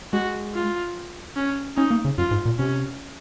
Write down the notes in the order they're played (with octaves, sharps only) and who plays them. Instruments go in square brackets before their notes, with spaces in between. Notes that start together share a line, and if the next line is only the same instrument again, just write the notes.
[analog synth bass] G#3 [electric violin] F#4
[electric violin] F4
C#4
[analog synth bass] C#4 [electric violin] D#4
[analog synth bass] A#3
C#3
[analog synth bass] F#2 [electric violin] F4
[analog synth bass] G#2
A#2
[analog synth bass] C3 [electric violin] C#4